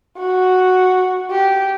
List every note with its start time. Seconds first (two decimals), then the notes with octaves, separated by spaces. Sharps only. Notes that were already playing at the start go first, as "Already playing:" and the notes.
0.18 F#4
1.31 G4